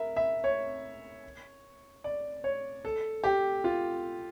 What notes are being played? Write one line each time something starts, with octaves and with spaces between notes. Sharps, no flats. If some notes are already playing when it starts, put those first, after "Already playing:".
Already playing: A#4 E5
E5
C#5
D5
C#5
A4
G4
F4